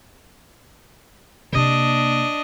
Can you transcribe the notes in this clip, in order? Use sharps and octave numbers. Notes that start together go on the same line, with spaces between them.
C3 A#3 D4 D#5